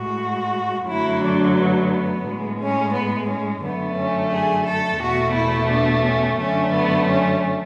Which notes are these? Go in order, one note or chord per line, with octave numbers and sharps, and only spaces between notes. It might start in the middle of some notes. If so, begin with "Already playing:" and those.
Already playing: A2 G#3 F#4
F#2 D3 F#3 A3 E4
D4
B3
A2 G#3
C#4
B3
C#4
F#2 D3 A3 B3
C#4
G#4
A4
E2 B2 A3 F#4
E4
D4
C#4
F#2 D3 A3 C#4
B3
C#4